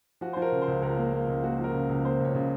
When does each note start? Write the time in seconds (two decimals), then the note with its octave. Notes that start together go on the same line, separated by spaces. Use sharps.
0.21 F3 F#4
0.33 F3 C5
0.42 A#4
0.52 C#3
0.62 C5
0.68 C#2
0.82 C#2 A#4
0.97 A#3
1.13 A#3
1.28 C#2
1.44 A#3 F#4
1.58 F3
1.64 A#4
1.74 C#3
1.89 C#2
2.05 A#3 C5
2.20 C#2 C#5
2.35 C#3